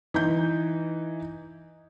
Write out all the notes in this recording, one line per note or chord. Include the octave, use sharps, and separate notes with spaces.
E3 D#4 G6